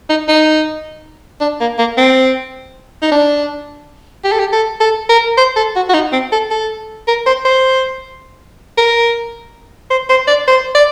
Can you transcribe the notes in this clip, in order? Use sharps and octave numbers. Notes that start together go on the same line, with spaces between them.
D#4
D#4
D4
A#3
A#3
C4
D#4
D4
G4
A4
G4
A4
A4
A#4
C5
A4
F#4
F#4
D#4
C4
A4
A4
A#4
C5
C5
A#4
C5
C5
D5
C5
D5